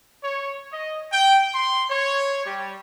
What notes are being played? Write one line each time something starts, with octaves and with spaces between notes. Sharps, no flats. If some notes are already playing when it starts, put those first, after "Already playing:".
C#5
D#5
G5
C6
C#5
G3